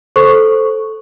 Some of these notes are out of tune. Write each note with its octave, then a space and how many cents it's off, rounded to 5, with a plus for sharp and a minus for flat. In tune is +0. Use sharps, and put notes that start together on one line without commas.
A4 -5 C5 +0 C#6 +0